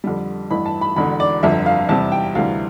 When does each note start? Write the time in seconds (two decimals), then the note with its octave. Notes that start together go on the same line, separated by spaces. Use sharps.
0.04 F2 D3 G3
0.51 A1 G2 E3 B5
0.66 A5
0.81 B5
0.96 E1 E2 D3 B5
1.20 D5
1.43 G1 F2 D3 E5
1.66 F5
1.89 E2 C3 G3 A5
2.12 G5
2.35 D2 C3 E3 G3 F5